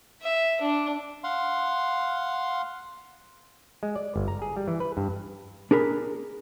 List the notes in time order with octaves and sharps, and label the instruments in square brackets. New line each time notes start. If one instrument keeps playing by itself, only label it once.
[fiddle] E5
D4
[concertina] F5 F#5 C6
[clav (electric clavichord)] G#3
D5
G1
A#5
G#4
G3
E3
B4
G2
[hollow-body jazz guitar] D4 G#4 A#4 B5